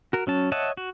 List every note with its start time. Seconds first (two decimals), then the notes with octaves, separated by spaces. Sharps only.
0.13 F#4 A#4
0.27 F#3 C#4 A5
0.52 C#5 D#5 E5 F#5 A5
0.77 F#4